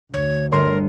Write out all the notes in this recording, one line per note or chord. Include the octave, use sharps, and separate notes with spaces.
D2 D3 C#5
G1 A#4 C#5 C6